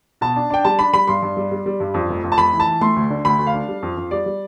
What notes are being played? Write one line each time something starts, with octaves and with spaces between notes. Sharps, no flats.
B2 A5
D4
D4 G5
G3 A5
D4 B5
G3 B5
G2 C6
G2
G3
G3
G3
G2
F2
F1
F2
A5
F1 B5
E3
A5
E3
A3 C6
D2
D3
D2 B5
D2
F5
D4
G3
F2
F2
G3 D5
G3